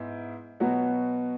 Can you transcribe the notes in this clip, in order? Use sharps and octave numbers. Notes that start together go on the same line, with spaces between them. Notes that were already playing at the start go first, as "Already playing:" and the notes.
Already playing: G#2 B3 E4
B2 F#3 B3 F#4